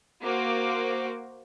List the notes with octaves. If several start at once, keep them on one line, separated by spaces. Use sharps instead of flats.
A#3 F#4 C5 D6